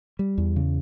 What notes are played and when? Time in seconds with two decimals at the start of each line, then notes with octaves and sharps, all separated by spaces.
0.19 G3
0.38 E2
0.56 C#3